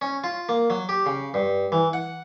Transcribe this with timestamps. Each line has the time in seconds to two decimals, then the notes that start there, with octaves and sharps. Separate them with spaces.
0.02 C#4
0.24 F4
0.49 A#3
0.70 F#3
0.89 G4
1.06 C#3
1.34 G2
1.72 E3
1.93 F#5